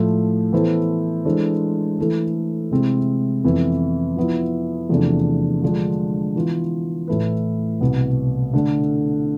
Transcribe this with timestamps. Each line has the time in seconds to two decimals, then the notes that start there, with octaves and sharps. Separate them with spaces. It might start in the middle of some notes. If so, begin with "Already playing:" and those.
Already playing: A2 F3 A3
0.53 E3 B3 E4 A4 C5
1.25 E3 G#3 D4 A4 C5
1.99 E3 A3 E4 A4
2.71 C3 G#3 C4 E4
3.44 F2 E3 B3 E4 B4
4.16 F3 B3 E4
4.89 E2 C3 F3 A3 D4
5.62 D3 F3 G#3 D4
6.36 E3 B3 F4
7.08 A2 E3 A3 E4 B4
7.81 C2 B2 B3
8.54 D3 A3 D4